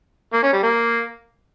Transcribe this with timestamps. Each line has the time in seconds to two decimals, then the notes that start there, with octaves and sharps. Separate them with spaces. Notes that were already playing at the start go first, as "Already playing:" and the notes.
0.33 A#3
0.43 C#4
0.53 G3
0.63 A#3